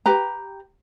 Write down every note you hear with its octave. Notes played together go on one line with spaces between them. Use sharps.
G4 B4 A#5